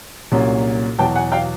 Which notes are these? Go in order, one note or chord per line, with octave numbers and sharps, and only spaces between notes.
C2 A#2 F#3 A#3 C#4
E2 B2 F#3 G5 A5
F#5 G#5
F5 G5